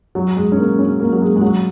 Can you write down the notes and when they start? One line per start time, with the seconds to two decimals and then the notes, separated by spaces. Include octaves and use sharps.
0.15 F#3
0.36 G#3
0.52 C#4
0.58 A#3
0.79 C#4
1.00 A#3
1.12 F#3
1.21 G#3
1.36 G#3
1.41 F#3